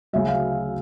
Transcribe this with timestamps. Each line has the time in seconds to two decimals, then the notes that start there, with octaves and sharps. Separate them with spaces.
0.13 D2 C#3 F#3 E5
0.28 F5